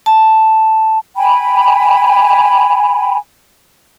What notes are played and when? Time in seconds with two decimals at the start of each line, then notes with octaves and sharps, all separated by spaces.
0.06 A5
1.16 G5 G#5 B5